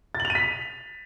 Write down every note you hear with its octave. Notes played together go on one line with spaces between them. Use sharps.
A6
F#7
F7
D#7
B6